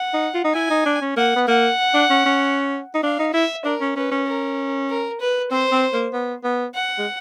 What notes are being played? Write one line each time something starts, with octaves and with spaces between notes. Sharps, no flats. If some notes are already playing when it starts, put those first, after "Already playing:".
Already playing: F#5
D#4
F4
D#4
E4 G#5
D#4
D4
C#4
A#3 F#5
B3
A#3 F#5
D4
C#4
C#4
D#4
D4 F5
D#4
E4 E5
D4 A#4
C#4
C#4 B4
C#4
A#4
A#4
B4
C4 C5
C4
A#3
B3
B3
F#5
G#3